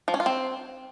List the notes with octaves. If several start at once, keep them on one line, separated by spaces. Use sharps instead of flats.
F3
C#4
F4
C4